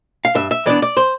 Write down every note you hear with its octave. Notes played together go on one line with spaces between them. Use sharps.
F5
G2 E5
E5
E3 B3 D4 D5
D5
C5